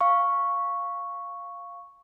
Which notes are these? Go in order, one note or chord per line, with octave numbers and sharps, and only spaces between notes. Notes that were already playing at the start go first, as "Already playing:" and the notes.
F5 C#6